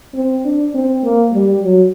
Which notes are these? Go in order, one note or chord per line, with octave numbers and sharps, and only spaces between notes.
C4
D4
C4
A#3
G3
F#3